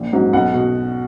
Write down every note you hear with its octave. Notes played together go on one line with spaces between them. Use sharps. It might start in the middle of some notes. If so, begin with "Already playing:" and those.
Already playing: A#1
G#2 F#3
B1 F#5
B2